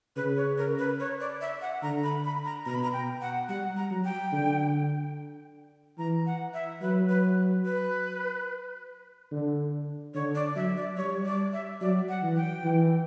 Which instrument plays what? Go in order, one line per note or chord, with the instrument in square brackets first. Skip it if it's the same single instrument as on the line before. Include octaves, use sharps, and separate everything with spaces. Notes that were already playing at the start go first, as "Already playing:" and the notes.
[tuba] C#3 [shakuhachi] B4
[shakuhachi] C#5
A#4
B4
C#5
D5
E5
F#5
[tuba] D3 [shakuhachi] A#5
[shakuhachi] B5
B5
A#5
[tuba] B2 [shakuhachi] A#5
[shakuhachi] B5
A#5
G5
F#5
[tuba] G3 [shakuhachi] F#5
[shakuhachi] A#5
[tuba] F#3
[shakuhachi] G5
[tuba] D3
[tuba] E3 [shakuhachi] A#5
[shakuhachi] F#5
E5
[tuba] F#3 [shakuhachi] B4
[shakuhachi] B4
B4
[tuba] D3
[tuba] D3 [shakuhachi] C#5
[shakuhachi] D5
[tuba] F#3 [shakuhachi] E5
[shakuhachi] D5
[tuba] G3 [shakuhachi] C#5
[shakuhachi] D5
E5
[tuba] F#3 [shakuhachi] D5
[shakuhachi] F#5
[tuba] E3
[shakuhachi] G5
[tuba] E3